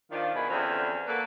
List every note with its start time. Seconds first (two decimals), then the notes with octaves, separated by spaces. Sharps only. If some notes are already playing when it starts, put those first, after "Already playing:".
0.12 D#3 F3 D4 F4
0.35 B2 D#3 E4 G#4
0.49 E2 D3 F3 C4 C#4
1.07 A#3 F#4 A4 B4